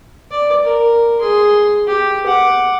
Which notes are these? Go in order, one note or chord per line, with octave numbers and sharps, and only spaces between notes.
D5
A#4
G#4 C6
G4
F#5 D6